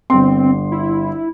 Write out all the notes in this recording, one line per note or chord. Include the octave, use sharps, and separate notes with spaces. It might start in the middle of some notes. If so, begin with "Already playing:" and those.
G1 C4 C6
E4